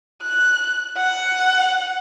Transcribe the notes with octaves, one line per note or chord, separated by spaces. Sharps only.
F#6
F#5